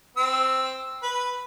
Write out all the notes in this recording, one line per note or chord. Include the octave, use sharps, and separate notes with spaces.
C4 E6
B4